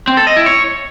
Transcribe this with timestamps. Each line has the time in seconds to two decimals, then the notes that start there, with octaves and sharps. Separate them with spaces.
0.07 C4
0.17 A4
0.27 D#5
0.37 E4
0.46 C#5